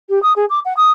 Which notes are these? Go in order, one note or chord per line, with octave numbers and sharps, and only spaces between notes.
G4
D#6
G#4
D6
F#5
D#6